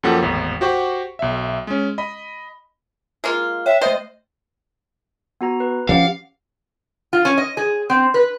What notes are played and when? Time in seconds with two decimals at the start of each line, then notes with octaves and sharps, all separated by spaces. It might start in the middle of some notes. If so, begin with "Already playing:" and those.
0.03 F#2 F3 A#3 G4 A4 F#5
0.22 G#1 E2 A2
0.61 F#4 G4 C5 F#5 C#6
1.19 B1 E5
1.67 G#3 C#4
1.98 D#5 B5
3.24 G#3 A#3 F4
3.66 C#5 E5 G5
3.81 A3 C5 D#5 E5
5.41 B3 F#4 A#5
5.60 B4
5.89 F3 C#4 G4 F5 F#5
7.13 F4
7.25 C#4
7.38 D#5
7.57 G#4
7.90 C4
8.14 B4